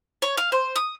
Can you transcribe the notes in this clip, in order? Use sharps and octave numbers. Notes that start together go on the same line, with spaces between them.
C#5
F5
C5
D#6